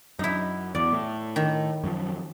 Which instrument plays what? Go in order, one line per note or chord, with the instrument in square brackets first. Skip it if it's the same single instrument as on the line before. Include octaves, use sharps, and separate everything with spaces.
[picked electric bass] F#2 [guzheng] D#4 E4
[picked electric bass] E2 [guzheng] D5
[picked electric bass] A2
[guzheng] D#3
[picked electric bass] F#2 F3